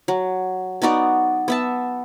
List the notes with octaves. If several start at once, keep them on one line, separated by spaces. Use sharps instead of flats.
F#3
B3 D#4 F#4 D5
B3 E5 A5